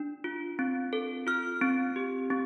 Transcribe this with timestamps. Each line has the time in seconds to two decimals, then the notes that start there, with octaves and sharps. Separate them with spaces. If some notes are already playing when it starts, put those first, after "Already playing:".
Already playing: D4
0.24 F4
0.59 C4
0.93 A4
1.27 F4 F6
1.61 C4
1.96 G4
2.30 C4